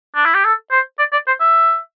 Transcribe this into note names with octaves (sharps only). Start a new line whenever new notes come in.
D4
E4
G4
A4
C5
D5
D5
C5
E5